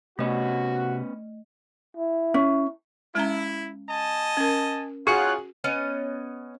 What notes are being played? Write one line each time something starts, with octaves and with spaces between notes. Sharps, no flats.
C3 A3 B3 C#4 F#4 D#5
E4
C#4
G#3 C#4 E4 A#5
D#5 G#5 A5
C#4 A#4
D#4 F4 F#4 G#4 C#5 F#5 F#6
B3 C#4 D#5